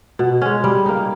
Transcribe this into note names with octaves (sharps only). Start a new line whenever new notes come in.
B2
G#3 C#4
G3
A#3 D#4